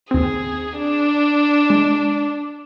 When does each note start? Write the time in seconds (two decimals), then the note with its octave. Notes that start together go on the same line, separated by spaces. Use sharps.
0.11 D#2 C4 G#4
0.77 D4
1.70 G#3